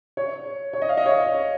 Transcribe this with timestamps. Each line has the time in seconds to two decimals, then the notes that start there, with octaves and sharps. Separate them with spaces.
0.17 C#5
0.73 C#5
0.82 D#5
0.89 F5
0.97 D#5
1.06 C#5